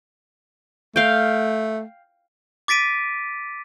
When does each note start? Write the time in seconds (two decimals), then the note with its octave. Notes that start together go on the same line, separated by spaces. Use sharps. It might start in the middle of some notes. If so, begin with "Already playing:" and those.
0.96 A3 F5 G5
2.68 D6 A6 B6 D7 D#7